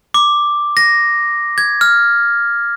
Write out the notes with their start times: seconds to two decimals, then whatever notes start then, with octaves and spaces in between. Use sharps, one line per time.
0.14 D6
0.77 A#6
1.58 G#6
1.81 F6